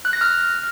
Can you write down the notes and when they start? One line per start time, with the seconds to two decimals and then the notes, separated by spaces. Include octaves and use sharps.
0.05 F#6
0.13 A#6
0.21 F6